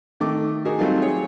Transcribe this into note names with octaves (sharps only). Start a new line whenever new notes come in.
D#3 A3 D6
D#4 F#4 G#4 A#4
F#3 G3 A3 C4 D#4 F4
G#4 C#5